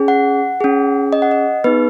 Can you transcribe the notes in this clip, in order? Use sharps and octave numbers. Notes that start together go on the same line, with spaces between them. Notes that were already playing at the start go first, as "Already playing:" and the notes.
Already playing: C#4 G#4
F#5
C#4 G#4
D#5
F#5
D#5
B3 D#4 G#4 B4